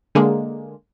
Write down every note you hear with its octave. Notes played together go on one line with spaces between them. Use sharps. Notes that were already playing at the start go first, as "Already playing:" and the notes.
D3 G#3 A#3